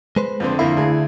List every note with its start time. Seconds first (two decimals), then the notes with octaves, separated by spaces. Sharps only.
0.16 G#3 B4 C5
0.40 F2 D3 C4
0.59 F2 D3 A#3 E4 F5
0.77 D2 G#4